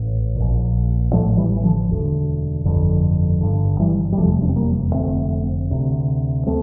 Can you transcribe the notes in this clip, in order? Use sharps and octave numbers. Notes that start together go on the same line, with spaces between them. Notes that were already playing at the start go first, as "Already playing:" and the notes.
Already playing: A1 A2
A#1 A#2
A1 A2 F3 A3
E3 G3
E3
D3 F3
E1 D2 D3
G1 F2 D3
G1 G2 D3
E3 G3
G3
F1 E2 C3 F3 A3
D4
C4
G3 A#3
F1 F2 D3 A3 C4
D2 C3
A3 C4